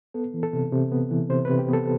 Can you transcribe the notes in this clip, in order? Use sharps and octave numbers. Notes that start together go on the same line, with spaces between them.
B3 A4
E3
A4
C3
C3
B3
E3
C3 C5
B4
C3
G4
B3 A4